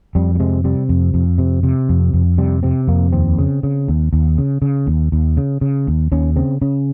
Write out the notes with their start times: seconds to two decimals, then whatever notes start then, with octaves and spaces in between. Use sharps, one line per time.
0.15 F2 G3
0.35 G3
0.40 C3 G#3
0.64 C3 G3
0.89 F2
1.14 F2
1.38 C3
1.63 C3
1.89 F2
2.13 F2
2.38 C3 G3
2.63 C3 C4
2.88 F2 A#3
3.12 D#2 C4
3.39 C#3
3.63 C#3
3.88 D#2
4.13 D#2
4.38 C#3
4.62 C#3
4.87 D#2
5.12 D#2
5.37 C#3
5.61 C#3
5.87 D#2
6.12 D#2 C#4
6.36 C#3 C4
6.62 C#3 C#4